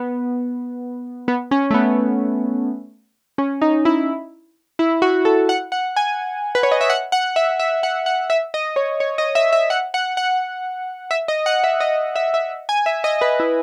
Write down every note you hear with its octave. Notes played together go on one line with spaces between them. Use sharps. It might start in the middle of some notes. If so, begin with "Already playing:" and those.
Already playing: B3
B3
C#4
A3
B3
C#4
D#4
E4
E4
F#4
A4
F#5
F#5
G#5
B4
C#5
D#5
E5
F#5
F#5
E5
E5
F#5
F#5
E5
D#5
C#5
C#5
D#5
E5
E5
F#5
F#5
F#5
E5
D#5
F#5
E5
D#5
E5
E5
G#5
E5
D#5
B4
E4